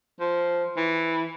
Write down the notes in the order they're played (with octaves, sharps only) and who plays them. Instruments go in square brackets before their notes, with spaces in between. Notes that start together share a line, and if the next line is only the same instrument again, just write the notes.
[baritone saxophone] F3
E3